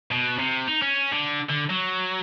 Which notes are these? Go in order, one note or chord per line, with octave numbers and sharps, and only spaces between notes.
B2
C3
D#4
C#4
D3
D3
F#3